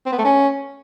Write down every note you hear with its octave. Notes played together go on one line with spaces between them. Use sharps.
C4
B3
A3
C#4